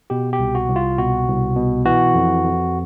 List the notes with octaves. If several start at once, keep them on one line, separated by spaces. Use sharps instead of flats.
B2 G4
G4
C2
F#4
C2
F4
B2 F#4
C2
B2
E3 F#4
F2
F2